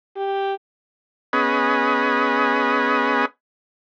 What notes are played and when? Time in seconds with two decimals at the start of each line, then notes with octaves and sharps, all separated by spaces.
0.16 G4
1.33 B3 C#4 G#4 B4 D#5